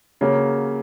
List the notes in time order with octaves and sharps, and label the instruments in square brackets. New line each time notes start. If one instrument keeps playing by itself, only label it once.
[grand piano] C#3 F#3 A#3